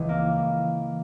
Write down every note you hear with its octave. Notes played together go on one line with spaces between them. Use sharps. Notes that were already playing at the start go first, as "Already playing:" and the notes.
Already playing: C#2 E3
A#3